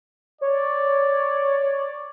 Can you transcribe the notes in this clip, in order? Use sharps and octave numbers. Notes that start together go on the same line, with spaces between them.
C#5 D5